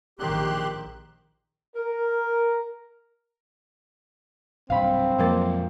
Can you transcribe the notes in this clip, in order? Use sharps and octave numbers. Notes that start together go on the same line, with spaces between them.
A#1 D#3 G4 C6 F#6
A#4
B1 G2 C3 C4 F5 B5
F2 A#2 F#3 G#3 A#3 A6